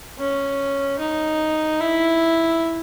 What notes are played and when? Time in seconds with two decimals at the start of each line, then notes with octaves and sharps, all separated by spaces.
0.18 C#4
0.99 D#4
1.80 E4